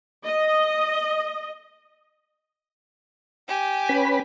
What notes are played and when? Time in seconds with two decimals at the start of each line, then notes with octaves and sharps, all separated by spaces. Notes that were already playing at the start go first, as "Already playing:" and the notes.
0.25 D#5
3.48 G4 G#5
3.89 C#4 B4 B5